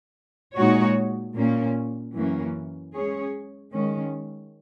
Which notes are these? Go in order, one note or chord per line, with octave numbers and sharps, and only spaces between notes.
A#2 G#3 D#4 F#4 C#5
A#2 A#3 C#4
F#2 E3 A#3 C#4
G#3 C#4 G#4 C#5
D#3 G#3 C#4